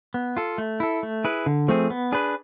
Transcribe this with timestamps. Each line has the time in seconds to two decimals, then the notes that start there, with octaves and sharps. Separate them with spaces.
0.14 B3
0.37 F4 A4
0.58 A3
0.80 E4 A4
1.03 A3
1.24 E4 G#4 B4
1.46 D3
1.68 F3 A3 C4 G#4
1.90 B3
2.12 D4 G#4 B4